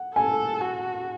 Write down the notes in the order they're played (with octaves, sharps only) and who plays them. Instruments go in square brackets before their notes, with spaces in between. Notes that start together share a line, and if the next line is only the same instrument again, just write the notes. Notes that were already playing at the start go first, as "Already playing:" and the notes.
Already playing: [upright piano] F#5
[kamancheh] A4 [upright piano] G#5
[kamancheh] F#4